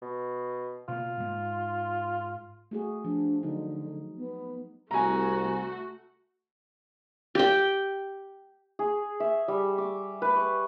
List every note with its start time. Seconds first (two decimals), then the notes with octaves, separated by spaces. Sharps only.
0.02 B2
0.88 B2 A#3 F4
1.20 G#2
2.71 A3 F#4 G#4
3.05 F3 D4
3.43 D3 F#3 D#4
4.17 B3
4.91 C2 A3 F#4 G#5 A#5
7.35 G4 G5
8.79 G#4
9.20 E5
9.48 G3
9.78 D6
10.22 B4
10.36 C#6